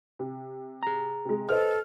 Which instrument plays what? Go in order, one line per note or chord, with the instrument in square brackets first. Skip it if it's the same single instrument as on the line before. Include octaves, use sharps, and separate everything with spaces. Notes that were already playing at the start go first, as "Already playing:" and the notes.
[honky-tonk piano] C3
[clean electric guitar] G#4 A#5
[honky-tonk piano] C3 G#3
[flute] A4 [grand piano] B4 C5 D#5 [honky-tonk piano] F6